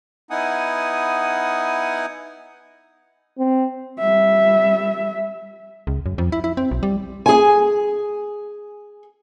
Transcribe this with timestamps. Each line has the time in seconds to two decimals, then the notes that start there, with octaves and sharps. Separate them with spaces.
0.31 B3 D#4 E4 F#5 G#5 D#6
3.39 C4
4.00 G3 E5
5.87 C#2
6.06 F#2
6.18 F2
6.32 E4
6.44 E4
6.57 C4
6.71 B1
6.83 G3
7.26 G#4 G#5